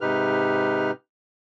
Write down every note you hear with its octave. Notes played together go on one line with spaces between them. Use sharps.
G#2 C3 D#4 G4 B4 F6